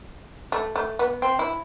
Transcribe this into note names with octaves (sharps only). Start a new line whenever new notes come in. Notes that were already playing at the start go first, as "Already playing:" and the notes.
A3
A3
B3
C4
E4